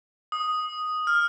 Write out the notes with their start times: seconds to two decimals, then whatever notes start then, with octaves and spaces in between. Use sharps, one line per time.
0.32 D#6
1.07 F6